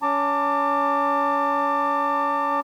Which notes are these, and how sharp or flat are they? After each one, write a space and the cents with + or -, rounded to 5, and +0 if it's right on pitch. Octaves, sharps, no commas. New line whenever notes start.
C#4 +25 A5 +35 D6 +5